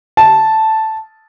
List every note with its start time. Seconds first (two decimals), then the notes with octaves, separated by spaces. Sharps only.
0.17 A5